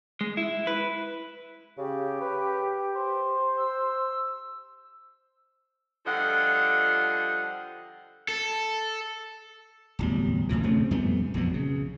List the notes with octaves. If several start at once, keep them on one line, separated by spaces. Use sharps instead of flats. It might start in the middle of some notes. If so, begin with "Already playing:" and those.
G#3
E4
B4
C#3 G4
B4
C5
E6
D3 F3 G3 D#5 F5 F#5
A4
D1 E2 G3
F2 A2 E3
C#3 A3 C4
F2 G3 A3 B3
A#1 F2 B2 F#3
C#3